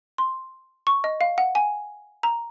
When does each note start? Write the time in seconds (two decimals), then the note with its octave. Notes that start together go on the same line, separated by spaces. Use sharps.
0.18 C6
0.87 C#6
1.04 D#5
1.21 F5
1.38 F#5
1.55 G#5
2.23 A#5